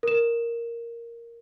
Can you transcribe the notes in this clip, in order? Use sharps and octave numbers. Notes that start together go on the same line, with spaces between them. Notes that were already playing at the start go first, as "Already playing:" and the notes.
A#4 E7